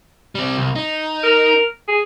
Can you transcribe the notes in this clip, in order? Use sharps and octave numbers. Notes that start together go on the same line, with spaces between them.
G3 C4
C2
D#4
A#4
G#4